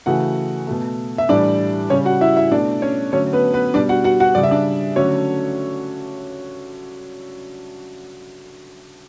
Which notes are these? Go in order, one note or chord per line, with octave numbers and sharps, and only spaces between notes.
C#3 E3 A3 F#4 F#5
B2 A3
E5
A2 E3 G3 D4 D5
C#3 G3 C#4 C#5
F#4 F#5
E4 E5
E4 E5
B2 A3 D4 D5
C#4 C#5
D3 F#3 A3 C#4 C#5
B3 B4
B3 B4
B2 G3 D4 D5
F#4 F#5
F#4 F#5
F#4 F#5
C#3 G3 D5
E5
D4 D5
D3 F#3 A3 C#4 C#5